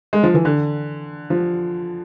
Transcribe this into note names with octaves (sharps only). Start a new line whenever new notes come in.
G#3
F3
E3
D3
F3